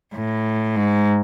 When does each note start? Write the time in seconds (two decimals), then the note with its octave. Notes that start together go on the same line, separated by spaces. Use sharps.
0.15 A2
0.76 G#2